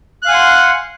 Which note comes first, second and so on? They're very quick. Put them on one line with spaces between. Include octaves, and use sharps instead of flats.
F#6 F5 G#5 F#5 C6